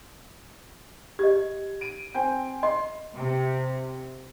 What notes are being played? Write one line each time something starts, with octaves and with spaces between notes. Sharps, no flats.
G4 D#5 G#6
D7 D#7
C4 G5 G#5
D#5 C6
C3